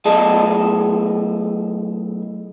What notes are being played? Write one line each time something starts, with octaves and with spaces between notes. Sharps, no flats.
B1 A2 G#4 D#5 A5